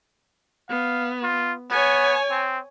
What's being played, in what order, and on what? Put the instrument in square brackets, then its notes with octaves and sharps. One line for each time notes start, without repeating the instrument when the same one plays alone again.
[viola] B3 [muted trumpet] F5
[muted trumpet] F4
[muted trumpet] B3 [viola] C#5 G#5
[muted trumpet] C4